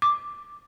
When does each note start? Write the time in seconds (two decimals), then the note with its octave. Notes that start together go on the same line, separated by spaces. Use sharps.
0.02 D6